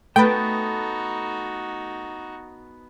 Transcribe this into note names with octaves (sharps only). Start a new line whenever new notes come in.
A3 B3 D#4 F#4 B4 G5 A5